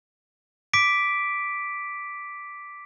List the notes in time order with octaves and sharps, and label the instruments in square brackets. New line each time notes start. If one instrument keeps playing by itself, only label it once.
[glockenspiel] D6 B6 D7